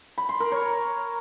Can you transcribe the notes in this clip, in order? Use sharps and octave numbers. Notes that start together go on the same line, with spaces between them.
B5
C6
A#4
C#5